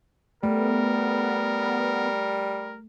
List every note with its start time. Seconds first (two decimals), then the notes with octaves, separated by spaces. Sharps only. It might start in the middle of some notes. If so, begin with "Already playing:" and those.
0.43 G3 A3 B3 A#4